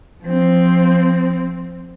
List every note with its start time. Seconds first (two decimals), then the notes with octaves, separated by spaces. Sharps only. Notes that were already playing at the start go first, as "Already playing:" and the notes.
0.24 F3 C4